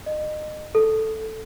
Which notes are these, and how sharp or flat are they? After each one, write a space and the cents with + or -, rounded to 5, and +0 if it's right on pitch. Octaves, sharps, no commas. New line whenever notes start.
D#5 -30
A4 +0